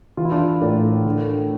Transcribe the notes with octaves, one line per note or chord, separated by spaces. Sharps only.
E3 F4
E4
D4 F4
A2 A#4 D5
D3